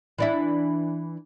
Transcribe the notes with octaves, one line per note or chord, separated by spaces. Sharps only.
E3 D4 E4